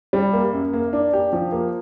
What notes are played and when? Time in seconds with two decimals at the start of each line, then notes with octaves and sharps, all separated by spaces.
0.13 G3
0.33 A#3
0.53 F#2
0.73 A#3
0.93 D4
1.13 G4
1.33 F3
1.52 A#3